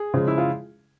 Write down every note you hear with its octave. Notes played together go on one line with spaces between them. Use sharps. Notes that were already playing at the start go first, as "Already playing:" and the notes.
Already playing: G#4
C#3 F3 G#3
E4
F4